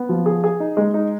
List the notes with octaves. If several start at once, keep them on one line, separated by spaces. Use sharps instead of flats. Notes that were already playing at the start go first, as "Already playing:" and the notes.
Already playing: B3
F3
G#4
G#4
D#4
G#3
D#4